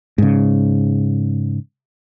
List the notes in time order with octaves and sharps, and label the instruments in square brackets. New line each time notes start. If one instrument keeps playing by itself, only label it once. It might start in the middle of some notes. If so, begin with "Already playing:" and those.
[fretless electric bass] G#2 C#3